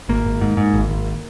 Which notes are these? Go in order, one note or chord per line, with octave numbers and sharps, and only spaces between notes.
G#1 A#3
G#1
G#2
G#2
G#1
G#1